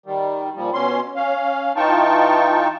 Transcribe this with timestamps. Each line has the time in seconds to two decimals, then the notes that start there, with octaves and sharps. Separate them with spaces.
0.06 D#3 G3
0.55 A#2 F3 G3
0.74 B2 C#4 C6
1.16 C#4 F5
1.76 E3 D#4 F4 G5 A5 C#6